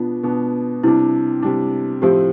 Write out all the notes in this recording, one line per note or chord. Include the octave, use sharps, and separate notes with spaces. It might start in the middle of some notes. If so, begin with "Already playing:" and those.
Already playing: B2 B3 D4 F4
B2 B3 D4
C3 G3 D4 E4
C3 G3 D4
A2 F3 C4 E4 G4